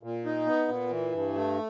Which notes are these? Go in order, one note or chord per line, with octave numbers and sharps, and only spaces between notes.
A#2
D#4
B3
A#2
E3
G2
A3